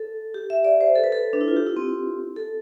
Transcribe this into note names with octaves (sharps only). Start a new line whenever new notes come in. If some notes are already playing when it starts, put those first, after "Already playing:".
Already playing: A4
G4
E5
D5
C5
A4
B4
A4
D4
E4
F4
G4
E4
C4
A4